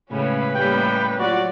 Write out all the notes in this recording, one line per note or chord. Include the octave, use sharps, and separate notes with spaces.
A2 C#3 G#3 C#4 B4
A2 G3 A#3 G5
F#3 F4 F#4 D5